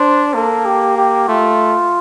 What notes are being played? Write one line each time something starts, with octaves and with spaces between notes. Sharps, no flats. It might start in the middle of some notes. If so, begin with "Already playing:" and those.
Already playing: D4 C5
A#3 A4
G4
G4
A3 F4